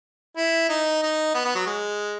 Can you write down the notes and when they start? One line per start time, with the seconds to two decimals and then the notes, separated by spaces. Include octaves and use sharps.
0.37 E4
0.69 D#4
1.02 D#4
1.35 B3
1.45 B3
1.55 F#3
1.66 G#3